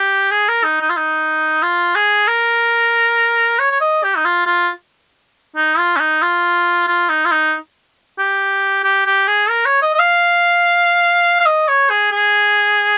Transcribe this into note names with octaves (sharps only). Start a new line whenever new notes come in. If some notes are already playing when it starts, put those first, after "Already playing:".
Already playing: G4
G#4
A#4
D#4
D#4
F4
D#4
F4
G#4
A#4
C#5
C#5
D#5
G4
D#4
F4
F4
D#4
F4
C#4
D#4
F4
F4
D#4
F4
D#4
G4
G4
G4
G#4
A#4
C#5
D#5
D#5
F5
F5
D#5
C#5
G#4
G#4